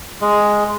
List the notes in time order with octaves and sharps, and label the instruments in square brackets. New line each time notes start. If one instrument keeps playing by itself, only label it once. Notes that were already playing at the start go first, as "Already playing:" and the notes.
[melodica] G#3